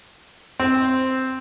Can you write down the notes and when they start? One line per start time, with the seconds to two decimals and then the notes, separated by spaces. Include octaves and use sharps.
0.60 C4